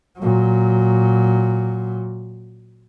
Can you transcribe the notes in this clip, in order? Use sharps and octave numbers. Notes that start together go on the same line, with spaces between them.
A#2 F#3